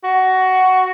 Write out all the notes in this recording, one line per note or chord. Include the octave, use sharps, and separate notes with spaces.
F#4